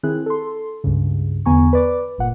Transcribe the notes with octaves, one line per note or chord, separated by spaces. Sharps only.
D#3 C4 E4 G#4 F#6
A4 C6
C#2 G2 C#3
E2 D3 B3 G#5 A#5 C#6
B4 D5 D6
G1 A#2 F#5